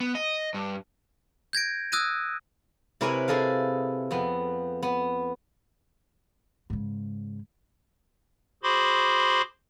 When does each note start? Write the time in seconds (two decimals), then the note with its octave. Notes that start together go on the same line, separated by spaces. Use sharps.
0.01 B3
0.15 D#5
0.54 G2
1.53 G6 G#6 A#6 D7
1.92 D#6 E6 F#6 G#6 A#6 D#7
3.01 C3 E4 A#4 B4 C#5 G#5
3.28 E4 G#4 A4 D#5 F5
4.11 F2 B3
4.82 B3
6.70 G#2 C#3
8.63 F#4 G#4 C5 B5 C6 D6